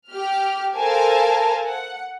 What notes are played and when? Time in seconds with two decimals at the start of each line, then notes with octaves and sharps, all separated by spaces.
0.11 G4 F6
0.78 A4 A#4 C5 F5 G#5 A5
1.69 F#5